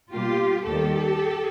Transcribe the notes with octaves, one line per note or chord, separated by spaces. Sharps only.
B2 G3 A#3 F4 G4
D#2 D#3 G3 A#3 G4 A4